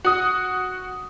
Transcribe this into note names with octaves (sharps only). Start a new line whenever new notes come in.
F#4 D#6